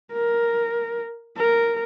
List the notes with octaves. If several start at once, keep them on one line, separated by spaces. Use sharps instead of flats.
A#4
A#4